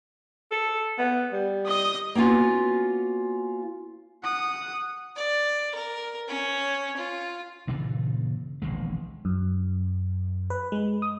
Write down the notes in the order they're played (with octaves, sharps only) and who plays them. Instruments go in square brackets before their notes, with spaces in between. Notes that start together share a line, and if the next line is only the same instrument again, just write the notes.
[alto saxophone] A4
B3
G3
[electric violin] D#5 D#6
[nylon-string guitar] A#3 B3 C#4 F4 F#4
[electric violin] F#5 D#6
[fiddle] D5
A#4
C#4 C#5
F4
[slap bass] G2 A#2 C#3 E3
E1 A#1 D#3 G#3
[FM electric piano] F#2
B4
G#3
D#6